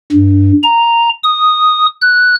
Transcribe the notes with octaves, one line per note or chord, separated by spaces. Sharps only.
G2
A#5
D#6
F#6